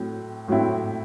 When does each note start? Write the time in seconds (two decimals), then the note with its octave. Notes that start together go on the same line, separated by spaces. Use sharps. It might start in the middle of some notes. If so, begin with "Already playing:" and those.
Already playing: A2 F#3 C4
0.48 A2 F#3 C4 E4